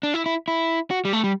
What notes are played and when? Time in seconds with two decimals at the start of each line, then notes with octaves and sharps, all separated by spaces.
0.03 D4
0.14 E4
0.26 E4
0.48 E4
0.91 F#4
1.05 G3
1.13 A3
1.24 G3